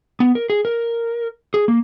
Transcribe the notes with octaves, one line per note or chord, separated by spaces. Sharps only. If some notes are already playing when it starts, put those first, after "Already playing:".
B3
A#4
G#4
A#4
G#4
A#3